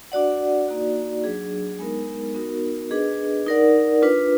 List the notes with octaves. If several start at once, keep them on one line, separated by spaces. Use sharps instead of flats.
D4 F#4 D5 F#5
A#3 D#4 F#4 D5
F#3 D4 G#4
G#3 B3 D#4 A#4
B3 D#4 F#4 A#4
D4 G#4 B4 D#5
D#4 A#4 D5 F#5
D4 F4 B4